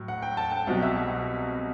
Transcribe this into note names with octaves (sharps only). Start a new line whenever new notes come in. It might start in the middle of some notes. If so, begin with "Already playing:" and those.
Already playing: A2 F#3
F#5
G5
A5
G5
C2 B2 F#3 F#5
E5